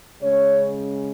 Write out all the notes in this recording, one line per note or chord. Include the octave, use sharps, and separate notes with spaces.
C#3 G#3 C#4 C#5